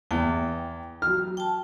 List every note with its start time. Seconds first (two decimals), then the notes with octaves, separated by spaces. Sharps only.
0.11 E2 G5
1.02 F#3 F6
1.37 G5 A5